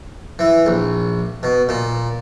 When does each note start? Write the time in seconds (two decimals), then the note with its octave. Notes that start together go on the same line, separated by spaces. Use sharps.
0.39 E3
0.66 A#1
1.43 B2
1.69 A#2